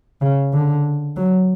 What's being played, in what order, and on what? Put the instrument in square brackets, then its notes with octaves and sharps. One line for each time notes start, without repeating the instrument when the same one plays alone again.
[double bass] C#3
D3
F#3